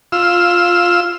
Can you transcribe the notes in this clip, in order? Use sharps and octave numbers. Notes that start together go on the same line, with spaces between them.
F4 E6